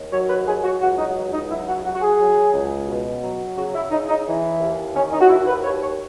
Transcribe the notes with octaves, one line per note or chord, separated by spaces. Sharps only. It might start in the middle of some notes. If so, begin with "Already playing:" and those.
Already playing: D#2
F#3 C#5
B4
F#3 G#4
F#4
C#2 F#4
D#4
C#2
D#4
F#3 E4
F#4
F#3 F#4
F#4
G#4
F#3
C#2
B2
F#3
C#3 F#4
E4
C#3 D#4
D#4
E3
D#2
D#3 C#4
D#4
F#4
D#2 E4
B4
D#2 C#5
C#5